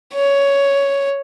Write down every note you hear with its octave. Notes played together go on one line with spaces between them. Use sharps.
C#5